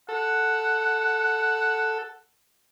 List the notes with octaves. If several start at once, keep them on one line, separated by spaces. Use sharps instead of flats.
A4 F#5